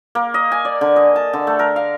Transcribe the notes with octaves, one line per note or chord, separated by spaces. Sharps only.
A#3
D#5
G#5
D5
D3
D#5
A5
D3
A3
A#4
F5